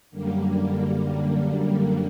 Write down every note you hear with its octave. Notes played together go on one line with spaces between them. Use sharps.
F#2 D3 G3 A#3